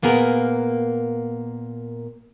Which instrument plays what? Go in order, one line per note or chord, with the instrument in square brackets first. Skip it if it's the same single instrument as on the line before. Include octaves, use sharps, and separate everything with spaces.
[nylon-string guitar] A#2 A#3 B3 G#4 A#4